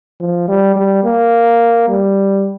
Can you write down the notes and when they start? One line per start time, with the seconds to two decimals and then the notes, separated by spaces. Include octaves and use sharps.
0.20 F3
0.48 G3
0.76 G3
1.04 A#3
1.88 G3